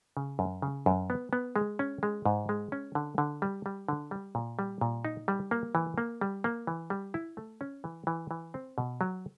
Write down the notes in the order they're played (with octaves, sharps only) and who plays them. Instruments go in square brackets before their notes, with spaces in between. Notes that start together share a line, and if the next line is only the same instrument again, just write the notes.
[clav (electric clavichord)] C#3
F#2
C#3
F#2
B3
B3
G#3
C#4
G#3
G#2
G#3
C#4
D3
D3
G3
G3
D3
G3
A#2
G3
A#2
D#4
G3
A#3
E3
A#3
G3
A#3
E3
G3
E4
A3
C#4
E3
E3
E3
C4
B2
F#3